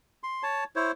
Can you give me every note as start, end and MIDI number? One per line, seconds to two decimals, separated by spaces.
0.23 0.43 84
0.43 0.64 73
0.43 0.64 81
0.76 0.92 64
0.76 0.92 72
0.76 0.92 73